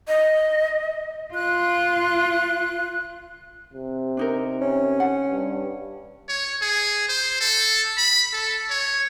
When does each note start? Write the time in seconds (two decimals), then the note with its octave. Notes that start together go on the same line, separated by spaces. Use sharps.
0.08 D#5
1.34 F4 F#6
3.74 C3
4.17 D4 D#4 A#4
4.62 C#4
5.00 F#5
5.29 G2
6.29 C#5
6.62 G#4
7.09 C5
7.40 A4
7.98 B5
8.33 A4
8.70 C#5